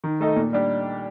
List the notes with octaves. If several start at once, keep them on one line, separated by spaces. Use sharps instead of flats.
D#3
A3 D#4 A4 D#5
A#2
G3 D4 G4